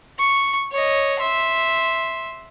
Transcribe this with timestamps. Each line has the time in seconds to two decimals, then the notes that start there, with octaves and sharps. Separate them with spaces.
0.18 C#6
0.72 C#5 D#5
1.20 E5 C6